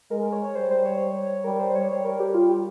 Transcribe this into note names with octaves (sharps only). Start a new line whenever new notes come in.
G#3 A#4
A#4
C#5
C#5
G3 C5
C5
C#5
G3 A#4
C5
C#5
G3 C#5
A#4
G4
F4
G4